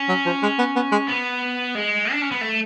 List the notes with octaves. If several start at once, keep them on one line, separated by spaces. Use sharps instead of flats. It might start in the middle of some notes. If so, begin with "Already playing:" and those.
Already playing: C#4
F#3
F3
G#3
B3
B3
G#3
B3
G#3
D4
C#4
B3
A3